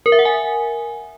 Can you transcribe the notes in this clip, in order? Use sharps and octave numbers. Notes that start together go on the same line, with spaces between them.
A#4
E5
F#5
G#5